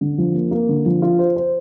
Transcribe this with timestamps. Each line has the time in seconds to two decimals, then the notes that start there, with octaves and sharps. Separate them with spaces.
0.01 D3
0.18 F3
0.34 A#3
0.51 A#3
0.69 D3
0.86 F3
1.02 F4
1.19 C5
1.36 C5